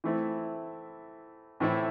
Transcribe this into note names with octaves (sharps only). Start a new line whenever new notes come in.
E3 A3 C4 E4
A2 E3 A3 C4 E4